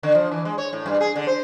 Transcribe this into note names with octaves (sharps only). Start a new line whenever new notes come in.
D3
F3
E3
G#3
C#5
A2
G2
G#4
D3
C5